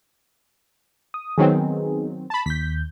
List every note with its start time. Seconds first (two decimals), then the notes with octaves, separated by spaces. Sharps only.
1.14 D#6
1.38 D#3 F#3 B3 C4 D#4 G#4
2.30 A5 B5
2.46 D#2 G6 B6